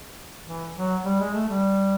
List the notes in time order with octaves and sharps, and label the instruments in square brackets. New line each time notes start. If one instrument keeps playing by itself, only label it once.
[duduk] E3
F#3
G3
G#3
A3
G3